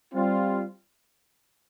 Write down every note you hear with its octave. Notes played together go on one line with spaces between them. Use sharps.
G3 C4 F4